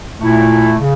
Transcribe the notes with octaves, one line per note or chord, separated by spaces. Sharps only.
A#2 A3 E4
C#3